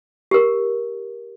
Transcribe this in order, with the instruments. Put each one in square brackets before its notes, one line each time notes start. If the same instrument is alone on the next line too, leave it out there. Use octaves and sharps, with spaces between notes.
[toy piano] G4 A#4